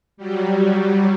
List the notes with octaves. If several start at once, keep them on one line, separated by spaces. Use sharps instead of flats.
F#3 G3